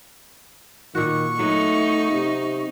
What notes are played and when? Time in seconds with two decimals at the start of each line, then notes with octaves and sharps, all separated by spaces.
0.95 A#2 D#3 F#4 C#6
1.39 F#3 A3 B3 D#4
2.12 C3